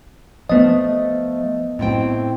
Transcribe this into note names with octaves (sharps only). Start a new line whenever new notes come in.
F3 A3 B3 D#5
A2 C4 G5